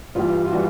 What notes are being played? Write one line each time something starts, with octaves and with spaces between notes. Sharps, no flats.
G2 E3 G3 F4
F4
E3 G3 F#4